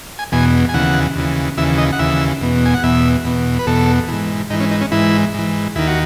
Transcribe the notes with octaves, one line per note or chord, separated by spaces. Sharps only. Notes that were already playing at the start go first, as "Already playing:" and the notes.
G#5
E2 B2 G#5
G#5
D#2 C#3 E3 F#5
D#2 C#3 E3
D#2 C#3 E3 E5
D#5
F#5
D#2 C#3 E3 E5
E2 B2
G#5
F#5
E2 B2 E5
E2 B2
B4
E2 B2 A4
G#2 E3
G#2 E3 D#4
C#4
D#4
C#4
G#2 E3 E4
G#2 E3
D#2 D#3 E4
F#4